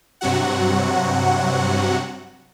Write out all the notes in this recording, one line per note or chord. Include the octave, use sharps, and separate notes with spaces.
G2 C3 F#3 F#4 F#5